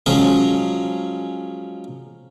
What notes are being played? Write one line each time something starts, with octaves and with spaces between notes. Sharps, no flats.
F3 F#3 G#3 C#4 G#4